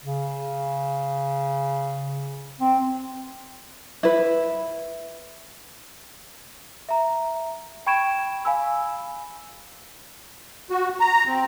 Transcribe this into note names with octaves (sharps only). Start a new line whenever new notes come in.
C#3
C4
E4 B4
E5 A#5
G5 B5 C#6 G#6 D7 E7
F5 G#5 B5 E6
F#4
A#5
C4